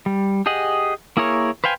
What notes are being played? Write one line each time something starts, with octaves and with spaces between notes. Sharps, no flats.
G3
G4 G#4 D#5 F#5
A#3 E4 G#4 A#4 C#5
B4 C5 F5 G5 G#5